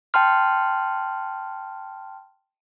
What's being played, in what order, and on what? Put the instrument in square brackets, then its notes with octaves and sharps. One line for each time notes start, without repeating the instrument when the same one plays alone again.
[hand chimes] G5 A5 C6 F6